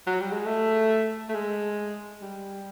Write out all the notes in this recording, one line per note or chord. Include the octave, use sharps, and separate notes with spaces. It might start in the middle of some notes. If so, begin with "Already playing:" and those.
F#3
G3
G#3
A3
A3
G#3
G3